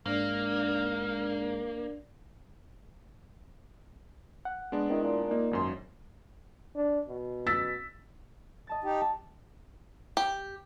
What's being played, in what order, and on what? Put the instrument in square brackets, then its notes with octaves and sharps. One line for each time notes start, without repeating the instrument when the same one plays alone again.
[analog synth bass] G#2 [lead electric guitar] A#3 [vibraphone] D4 D5 [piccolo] F6
[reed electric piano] F#5
[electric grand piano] G#3 B3 D4
[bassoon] D#3 [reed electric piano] C4 E4
[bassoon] A#2
[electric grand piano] A#3 [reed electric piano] D#4
[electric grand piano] G#1 F#2 C6
[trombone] D4
B2
[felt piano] E6 A6 B6
[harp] D#5 A5 A6
[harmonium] D#4 G4
[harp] A5
[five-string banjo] G4